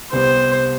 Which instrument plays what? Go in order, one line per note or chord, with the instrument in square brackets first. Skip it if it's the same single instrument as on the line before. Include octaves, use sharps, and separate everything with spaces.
[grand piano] C2 C3 G3 B3 [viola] C5